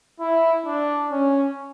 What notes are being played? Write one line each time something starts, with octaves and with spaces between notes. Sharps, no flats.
E4
D4
C#4